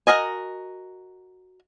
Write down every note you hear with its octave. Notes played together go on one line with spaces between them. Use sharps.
F#4 G#4 A#4 D#5 G#5